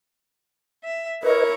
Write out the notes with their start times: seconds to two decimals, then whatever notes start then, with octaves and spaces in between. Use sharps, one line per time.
0.84 E5
1.23 E4 A#4 B4 C#5 D#5 A#5